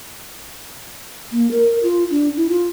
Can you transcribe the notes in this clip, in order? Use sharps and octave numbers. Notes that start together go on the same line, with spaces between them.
A#3
A#4
F4
D4
E4
F4